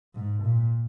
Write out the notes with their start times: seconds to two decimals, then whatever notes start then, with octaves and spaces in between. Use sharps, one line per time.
0.15 G#2
0.43 A#2